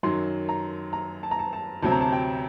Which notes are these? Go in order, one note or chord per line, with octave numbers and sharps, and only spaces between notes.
F#2 D#3 F#3 C6
A#5
A#5
A5
A#5
A5
A5
D2 C3 F#3 C4 A5
A#5
A5
G5